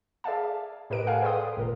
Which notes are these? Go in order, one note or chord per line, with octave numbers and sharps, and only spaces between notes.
G#4 D5 E5 F5 A5
A2 G4 A#4 B4 D#5 D7
A4 F5 F#5 G#5
G#4 B4 D5 G5 C6 D#6
G#1 A#2 A#4